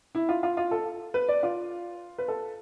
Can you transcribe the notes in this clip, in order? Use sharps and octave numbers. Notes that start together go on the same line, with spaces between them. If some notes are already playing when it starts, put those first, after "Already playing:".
E4
F4
F4
F4
A4
B4
D5
F4
B4
A4